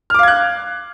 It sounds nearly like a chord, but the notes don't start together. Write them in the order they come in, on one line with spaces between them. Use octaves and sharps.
F6 D6 F5 G#6 F#6